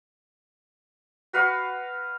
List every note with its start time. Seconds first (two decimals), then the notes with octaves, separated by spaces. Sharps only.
1.33 F#4 B4 F5